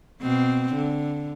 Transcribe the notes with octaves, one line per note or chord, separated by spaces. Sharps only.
B2 C4
D3